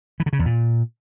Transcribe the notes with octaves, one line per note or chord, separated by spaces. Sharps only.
E3
D3
C#3
E2
A#2